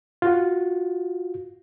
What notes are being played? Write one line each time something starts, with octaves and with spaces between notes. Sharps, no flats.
F4 F#4